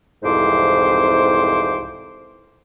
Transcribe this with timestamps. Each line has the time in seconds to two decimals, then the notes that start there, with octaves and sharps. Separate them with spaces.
0.23 C2 F2 G#2 E3 C5 D6